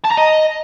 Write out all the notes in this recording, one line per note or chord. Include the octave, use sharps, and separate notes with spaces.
A5
A#5
D#5